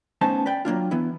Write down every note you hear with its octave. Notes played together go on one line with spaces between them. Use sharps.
A3 B3 C#4 D#4 C5 A5
B4 D5 G5
F#3 A#3 D4 F4
E3 B3 E4